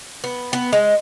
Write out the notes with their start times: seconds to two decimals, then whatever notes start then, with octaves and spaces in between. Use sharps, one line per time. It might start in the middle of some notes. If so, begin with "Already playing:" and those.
0.24 B3
0.53 B3
0.73 G#3